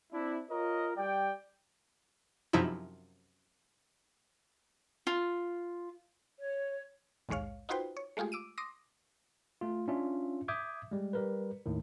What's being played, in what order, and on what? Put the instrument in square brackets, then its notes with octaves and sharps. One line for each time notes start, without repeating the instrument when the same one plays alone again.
[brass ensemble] C4 D4 E4
F4 A#4 C#5 D#5
G3 D5 G5
[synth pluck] F#2 C3 F3 D#4 E4
[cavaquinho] F4
[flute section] C#5
[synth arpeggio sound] A#1 D#2 G#2 G#3 C#5 F5
D#4 F4 F#4 B4 C5 G5
C#5
G#3 A3 F4 G4 G#4
D6 E6 D7 D#7
C6 D6 D#6 A#6
[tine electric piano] A3 F4
C#4 D4 F4 E5
E5 D6 D#6 G6 G#6
G3 G#3
G3 A#4 B4
D#2 A2 D#3